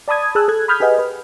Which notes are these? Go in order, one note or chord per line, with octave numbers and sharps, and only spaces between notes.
D5 A5 B5 D#6 G#6
G#4 A5 E6 F#6
A4 F#6 G#6
B5 D#6 F6 G6 G#6 B6
G4 G#4 B4 D#5 F#5 G#5
B4